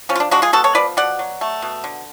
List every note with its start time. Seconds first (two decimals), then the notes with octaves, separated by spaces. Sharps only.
0.09 F3 C#4
0.15 F4
0.20 D4
0.31 G#3 D4 F#4
0.42 F4 G#4
0.53 B3 F#4 A4
0.64 A4 C#5
0.75 F3 B4 D5
0.97 B2 D5 F#5
1.19 F#3
1.41 A3
1.62 B2
1.84 D3